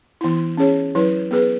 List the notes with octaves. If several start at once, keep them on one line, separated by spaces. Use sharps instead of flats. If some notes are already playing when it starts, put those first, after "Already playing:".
E3 B3 E4
C#4 G#4 C#5
F#3 E4 B4
B3 G#4 B4